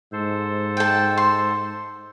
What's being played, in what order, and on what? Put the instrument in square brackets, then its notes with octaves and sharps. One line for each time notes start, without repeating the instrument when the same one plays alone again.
[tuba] G#2 [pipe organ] A4 C5
[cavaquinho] G5 A5
C6